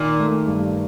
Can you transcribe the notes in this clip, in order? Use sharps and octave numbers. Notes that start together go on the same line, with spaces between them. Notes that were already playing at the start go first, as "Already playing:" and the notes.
Already playing: A#2 D#3
A3
G2